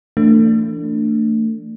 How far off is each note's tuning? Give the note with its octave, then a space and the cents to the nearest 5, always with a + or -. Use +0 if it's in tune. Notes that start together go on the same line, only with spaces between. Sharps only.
E3 +25 A3 +30 D4 +0